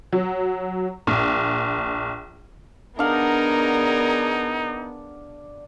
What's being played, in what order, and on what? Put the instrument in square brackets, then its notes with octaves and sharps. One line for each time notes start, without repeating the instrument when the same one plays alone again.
[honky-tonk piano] F#3
A#1
[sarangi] B3 [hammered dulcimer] D4 F5 F#5 [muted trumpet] D#4 [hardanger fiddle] G#4 A#4